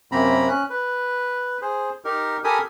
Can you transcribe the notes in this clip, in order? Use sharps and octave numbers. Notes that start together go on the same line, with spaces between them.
F#2 C3 A#3 C4 A#5 B5
C#4 F#6
B4
G#4 C5
D#4 G4 A#4
G4 A4 A#4 G#5 B5 D#6